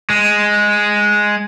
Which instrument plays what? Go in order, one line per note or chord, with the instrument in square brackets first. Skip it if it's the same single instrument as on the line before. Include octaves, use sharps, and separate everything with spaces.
[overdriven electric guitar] G#3